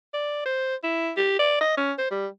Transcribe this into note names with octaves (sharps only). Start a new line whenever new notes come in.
D5
C5
E4
G4
D5
D#5
C#4
C5
G3